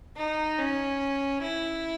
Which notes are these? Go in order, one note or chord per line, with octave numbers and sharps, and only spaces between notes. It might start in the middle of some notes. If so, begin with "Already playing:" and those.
D#4
C#4
E4